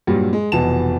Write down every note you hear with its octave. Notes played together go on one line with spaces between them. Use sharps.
G2 A#2 F#3 G3
G#3
F1 B2 E3 A5 E7